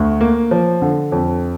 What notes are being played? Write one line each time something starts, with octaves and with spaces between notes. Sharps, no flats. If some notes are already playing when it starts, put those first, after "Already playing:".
Already playing: D2
A#3
F3
D3
F2